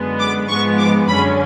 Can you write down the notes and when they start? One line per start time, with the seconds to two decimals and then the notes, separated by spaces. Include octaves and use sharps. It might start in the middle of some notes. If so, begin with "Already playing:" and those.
Already playing: F#2 D3 G#3 B3
0.20 D6
0.49 G#2 F3 G#3 B3 C#6
0.79 D6
1.08 F#2 D3 G#3 C#4 B5